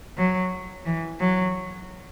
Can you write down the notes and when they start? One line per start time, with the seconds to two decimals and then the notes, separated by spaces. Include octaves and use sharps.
0.18 F#3
0.86 E3
1.19 F#3